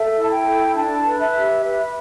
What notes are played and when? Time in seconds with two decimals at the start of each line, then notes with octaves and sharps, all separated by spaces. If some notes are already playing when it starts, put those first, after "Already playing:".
Already playing: A4 E5
0.16 E4
0.22 A5
0.31 G5
0.46 A4
0.75 D4 A5
1.05 B4
1.21 E5
1.36 G4
1.65 B4 E5